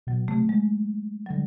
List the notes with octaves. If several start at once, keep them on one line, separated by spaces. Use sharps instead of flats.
B2 F#3
C3 A3
G#3
F#3
D3 G3